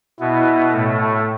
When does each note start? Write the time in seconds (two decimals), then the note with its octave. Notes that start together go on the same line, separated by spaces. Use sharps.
0.20 B2 B3 E4
0.72 A2 A3 A4